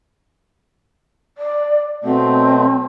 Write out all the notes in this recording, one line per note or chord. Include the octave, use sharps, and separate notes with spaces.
D5
B2 F#3 A3 C4